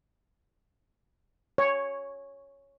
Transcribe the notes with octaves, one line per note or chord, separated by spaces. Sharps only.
C#5